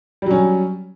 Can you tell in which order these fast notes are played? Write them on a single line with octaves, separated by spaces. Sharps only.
G3 F#3 C#4